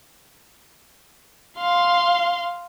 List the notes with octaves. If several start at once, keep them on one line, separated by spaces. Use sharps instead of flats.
F5 C6